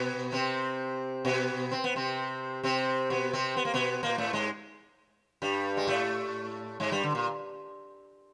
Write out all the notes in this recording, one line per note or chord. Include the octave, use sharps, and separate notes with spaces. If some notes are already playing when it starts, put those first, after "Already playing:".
Already playing: B2 B3
C3 C4
B2 B3
C4
B3
C3 C4
C3 C4
B2 B3
C3 C4
B3
A#3
B2 B3
A#2 A#3
A2 A3
G#2 G#3
G2 G3
G#3
A2 A3
G#2 G#3
G2 G3
D3
A#2